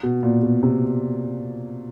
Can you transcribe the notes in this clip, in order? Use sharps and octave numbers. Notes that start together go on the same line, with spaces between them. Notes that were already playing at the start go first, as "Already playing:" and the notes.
B2
A#2
B2
C3